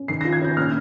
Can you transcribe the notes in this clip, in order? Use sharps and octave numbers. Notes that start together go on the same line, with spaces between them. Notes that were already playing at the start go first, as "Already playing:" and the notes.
Already playing: C#4
D#3 C7
F4 A#6
G#6
C#4 G6
A#2 F6